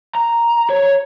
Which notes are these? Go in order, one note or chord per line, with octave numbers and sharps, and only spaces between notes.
A#5
C#5